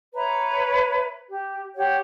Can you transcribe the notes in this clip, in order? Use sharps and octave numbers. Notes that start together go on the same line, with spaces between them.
B4 C#5 E5 A#5
G4
G4 C#5 F#5